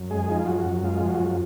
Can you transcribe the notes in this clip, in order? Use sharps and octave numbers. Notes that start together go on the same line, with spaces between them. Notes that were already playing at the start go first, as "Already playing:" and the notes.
Already playing: F#2
G#3 G#4
F3 D#4
F4
F#2 F#4
F#2
G#3 F4
F3
F#4
F#2